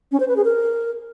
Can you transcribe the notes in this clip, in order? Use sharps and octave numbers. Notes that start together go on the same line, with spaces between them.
C#4
C5
B4
G#4
A#4